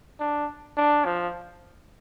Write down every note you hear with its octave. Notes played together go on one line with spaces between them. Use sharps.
D4
D4
F3